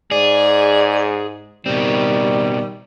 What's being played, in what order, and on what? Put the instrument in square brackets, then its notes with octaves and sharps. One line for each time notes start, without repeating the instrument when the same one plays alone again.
[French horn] G#2 [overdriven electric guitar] G#4 [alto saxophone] D5
[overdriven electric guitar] B2 C4 [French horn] D#3 [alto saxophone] G3